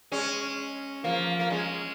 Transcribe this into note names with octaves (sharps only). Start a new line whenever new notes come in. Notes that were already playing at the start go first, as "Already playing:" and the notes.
G#3 C#4
F3 A#3
A#3
G#3 C#4